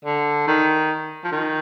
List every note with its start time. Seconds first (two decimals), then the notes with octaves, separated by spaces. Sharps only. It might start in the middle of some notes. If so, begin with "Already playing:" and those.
0.05 D3
0.47 D#3
1.24 F3
1.32 D#3